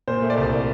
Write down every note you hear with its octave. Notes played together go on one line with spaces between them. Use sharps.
A#2 C5
A3
D5
C2